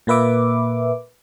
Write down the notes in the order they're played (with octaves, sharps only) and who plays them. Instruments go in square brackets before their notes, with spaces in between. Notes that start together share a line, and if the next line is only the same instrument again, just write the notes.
[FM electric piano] A#2 A#3 B4 E5 D6